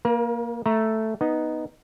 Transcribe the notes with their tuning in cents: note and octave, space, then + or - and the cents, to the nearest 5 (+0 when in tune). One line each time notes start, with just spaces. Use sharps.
A#3 +0 A#4 +40
A3 +0 A#5 +0
B3 +0 D#4 +0